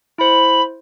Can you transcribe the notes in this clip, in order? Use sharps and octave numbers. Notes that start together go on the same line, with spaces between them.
E4 C5 B5